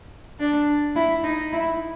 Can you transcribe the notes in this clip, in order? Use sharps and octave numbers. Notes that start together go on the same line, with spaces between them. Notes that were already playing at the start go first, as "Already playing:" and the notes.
D4
E4
D#4
E4